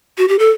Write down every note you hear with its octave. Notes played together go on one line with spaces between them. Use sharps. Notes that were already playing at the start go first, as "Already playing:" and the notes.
F#4
G4
A4